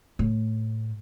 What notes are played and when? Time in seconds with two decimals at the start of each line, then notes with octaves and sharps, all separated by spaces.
0.19 A2